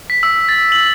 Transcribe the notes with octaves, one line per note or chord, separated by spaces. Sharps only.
B6
E6
A6
F#7